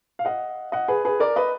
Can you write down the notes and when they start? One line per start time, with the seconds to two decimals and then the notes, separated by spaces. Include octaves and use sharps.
0.19 F5
0.25 D#5 F#5
0.72 D#5 F#5
0.88 G#4 B4
1.05 G#4 B4
1.20 A#4 D5
1.36 B4 D#5